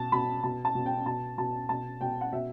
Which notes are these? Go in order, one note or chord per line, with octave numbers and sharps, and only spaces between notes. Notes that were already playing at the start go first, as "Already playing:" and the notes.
Already playing: B2 A5
B2 B5
B2 A5
A5
B2
G5
B2 A5
B2 A5
B2 A5
B2 G5
F#5
B2 E5